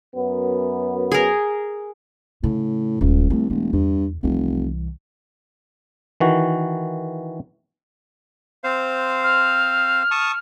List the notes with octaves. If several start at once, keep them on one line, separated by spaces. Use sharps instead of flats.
F#2 B3
G#4 A#4
A2 C#3
D#1 C#2 C#4
C2 F3 A3
E1 A3
E2 G2
F1 C2 E3
D#3 E3 F#4
C4 C5 F5
F6
A5 C#6 D#6